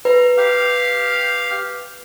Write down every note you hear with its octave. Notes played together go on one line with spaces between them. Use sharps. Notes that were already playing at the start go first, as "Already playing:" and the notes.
B4 A#5
G4 F5